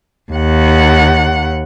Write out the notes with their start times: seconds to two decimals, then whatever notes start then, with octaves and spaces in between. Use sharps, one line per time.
0.32 D#2 F#5